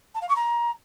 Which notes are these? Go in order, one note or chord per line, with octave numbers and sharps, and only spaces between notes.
A5
F5
C#6
A#5